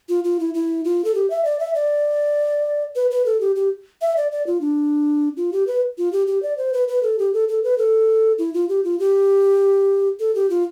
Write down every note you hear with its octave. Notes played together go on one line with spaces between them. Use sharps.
F4
F4
E4
E4
F4
A4
G4
E5
D5
E5
D5
B4
B4
A4
G4
G4
E5
D5
D5
F4
D4
F4
G4
B4
F4
G4
G4
D5
C5
B4
B4
A4
G4
A4
A4
B4
A4
E4
F4
G4
F4
G4
A4
G4
F4